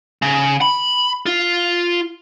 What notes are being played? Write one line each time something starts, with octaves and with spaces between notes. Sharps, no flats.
C#3
B5
F4